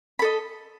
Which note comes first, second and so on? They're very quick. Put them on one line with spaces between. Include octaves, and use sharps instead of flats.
B5 A4 D#5